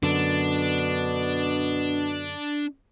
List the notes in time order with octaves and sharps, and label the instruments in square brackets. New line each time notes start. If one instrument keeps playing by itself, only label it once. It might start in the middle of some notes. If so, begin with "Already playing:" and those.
[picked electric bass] F#2 D3 [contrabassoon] B2 [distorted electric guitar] D4